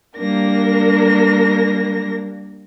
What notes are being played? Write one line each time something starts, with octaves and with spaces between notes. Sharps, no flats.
G3 A#3 D4 A#4 A#6